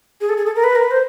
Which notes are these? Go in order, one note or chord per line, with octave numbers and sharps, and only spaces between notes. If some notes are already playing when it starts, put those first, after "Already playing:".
G#4
A4
G#4
A4
A#4
B4
A#4
B4
C5